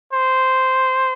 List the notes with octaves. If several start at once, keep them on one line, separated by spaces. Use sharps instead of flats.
C5